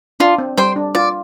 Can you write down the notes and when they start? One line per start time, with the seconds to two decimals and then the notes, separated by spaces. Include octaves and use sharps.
0.20 D4 F4
0.38 C4
0.57 G3 C5 G5 C6
0.76 D4
0.95 F4 D5